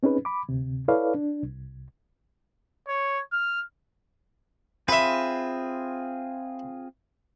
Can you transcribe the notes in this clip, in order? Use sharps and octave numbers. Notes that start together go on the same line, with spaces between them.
C4 C#4 D#4 G#4 B4
B5 D6
D2 C3
E4 A4 B4 C#5 D5 F5
D4
C2
C#5
F6
C4 F4 G#4 B4 E5